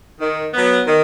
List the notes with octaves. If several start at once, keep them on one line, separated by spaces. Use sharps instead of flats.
D#3
F#3 B3
D#3